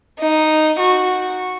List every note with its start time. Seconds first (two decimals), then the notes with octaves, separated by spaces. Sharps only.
0.19 D#4
0.79 F#4